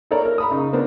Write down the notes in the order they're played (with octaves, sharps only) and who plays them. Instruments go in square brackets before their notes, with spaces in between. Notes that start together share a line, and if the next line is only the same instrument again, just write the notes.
[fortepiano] A4 A#4 C#5 D5 A#5
A#4
A#5 B5 D#6
C#3 D#4
B3 D4 A#4 C5